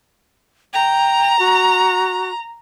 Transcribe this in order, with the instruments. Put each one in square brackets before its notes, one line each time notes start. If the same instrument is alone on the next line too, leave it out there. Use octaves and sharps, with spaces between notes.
[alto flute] G5 [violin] A#5
[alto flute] F#4